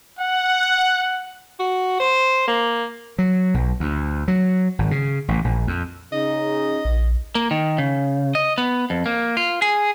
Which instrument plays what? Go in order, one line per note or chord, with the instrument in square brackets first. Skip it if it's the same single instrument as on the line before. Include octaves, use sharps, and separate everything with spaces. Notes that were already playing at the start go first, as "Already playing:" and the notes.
[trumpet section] F#5
[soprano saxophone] F#4
C5
A#3
[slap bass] F#3
B1
D2
F#3
G#1
C#3
A1
A#1
F2
[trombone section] C#3 D#4 [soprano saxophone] D#5
[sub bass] A#1
[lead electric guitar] A#3
D#3
C#3
D#5
B3
F2
A#3
F4
G#4